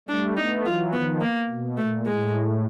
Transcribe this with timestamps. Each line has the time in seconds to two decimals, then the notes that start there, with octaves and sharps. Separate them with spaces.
0.09 G3 A3 D4
0.37 A3 B3 D#4
0.64 E3 F#3 F4
0.93 D#3 F3 B3
1.21 A#3
1.50 B2
1.78 A#2 A3
2.06 A2 G#3